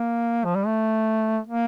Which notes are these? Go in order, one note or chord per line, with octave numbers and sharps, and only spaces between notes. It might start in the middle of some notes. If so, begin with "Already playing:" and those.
Already playing: A#3
F3
G3
A3
A#3